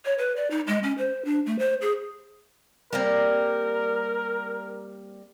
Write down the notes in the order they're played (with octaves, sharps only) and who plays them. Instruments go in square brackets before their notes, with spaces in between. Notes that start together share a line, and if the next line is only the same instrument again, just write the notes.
[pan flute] C#5
B4
D5
D#4
G#3
C#4
C5
D4
A3
C5
G#4
[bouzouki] G3 A#3 C4 [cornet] A#4